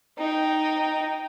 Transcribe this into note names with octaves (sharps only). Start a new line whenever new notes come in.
D#4 G5